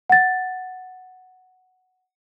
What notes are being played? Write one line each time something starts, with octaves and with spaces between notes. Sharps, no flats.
F#5 A6